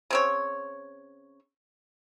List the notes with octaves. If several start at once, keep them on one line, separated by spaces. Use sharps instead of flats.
C#3 C4 C#5